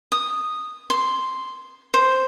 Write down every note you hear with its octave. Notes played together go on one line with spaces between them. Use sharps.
D#6
C6
C5